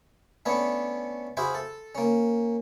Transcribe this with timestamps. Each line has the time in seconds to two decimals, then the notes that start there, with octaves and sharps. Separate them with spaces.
0.46 A3 B3 C#4 D4 C#5
1.37 E4 F#4 G#4 C5 E5 F5
1.55 A4
1.95 A#3 C#4